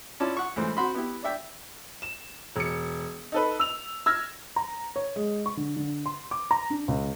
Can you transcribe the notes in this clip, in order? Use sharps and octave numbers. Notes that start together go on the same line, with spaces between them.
C#4 E4 F4 D5 A5
F#5 C#6
C#2 A2 E3 C5
C4 F#4 B5 C6
B3 E4 G4
D4 D5 E5 G5
E7
E1 C#7
D#4 A4 B4
E6 F7
E6 F6 G#6 A#6
A#5
C#5
G#3
C#6
D3
D3
C6
D6
A#5
D4
C#2